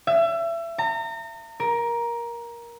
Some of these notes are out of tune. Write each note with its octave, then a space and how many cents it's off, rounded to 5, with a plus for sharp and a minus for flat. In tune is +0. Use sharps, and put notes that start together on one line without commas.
E5 +30
A#5 -35
A#4 +15